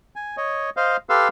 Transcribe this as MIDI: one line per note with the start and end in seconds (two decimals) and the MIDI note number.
0.16 0.36 80
0.37 0.70 73
0.37 0.70 75
0.77 0.97 72
0.77 0.97 75
0.77 0.97 77
1.09 1.28 67
1.09 1.28 69
1.09 1.28 71
1.09 1.28 77
1.09 1.28 84
1.09 1.28 88